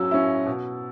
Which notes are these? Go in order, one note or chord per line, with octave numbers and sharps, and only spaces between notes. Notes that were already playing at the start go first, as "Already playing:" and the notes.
Already playing: F#3 C#4 E6
C#4 E4
B2